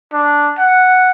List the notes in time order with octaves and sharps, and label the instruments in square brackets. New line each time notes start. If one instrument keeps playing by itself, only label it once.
[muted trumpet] D4
F#5